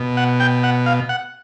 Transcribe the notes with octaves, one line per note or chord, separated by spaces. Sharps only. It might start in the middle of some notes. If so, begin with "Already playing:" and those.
Already playing: B2
F#5
G5
F#5
F5
F#5